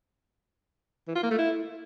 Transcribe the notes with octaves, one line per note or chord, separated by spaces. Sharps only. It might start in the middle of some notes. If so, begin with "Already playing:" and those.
E3
F4
A#3
A3
E4